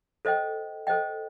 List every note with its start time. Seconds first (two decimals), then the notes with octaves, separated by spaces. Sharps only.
0.25 A4 C5 D#5 G5
0.87 A4 C5 D#5 G5